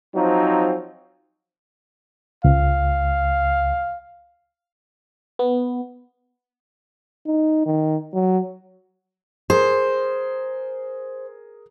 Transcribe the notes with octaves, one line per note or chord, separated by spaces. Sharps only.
F3 F#3 C4 D#4
C#2 F5
B3
D#4
D#3
F#3
G#4 A#4 C5